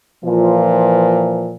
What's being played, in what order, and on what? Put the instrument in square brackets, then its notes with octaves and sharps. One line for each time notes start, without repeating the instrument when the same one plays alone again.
[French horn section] A#2 E3 F3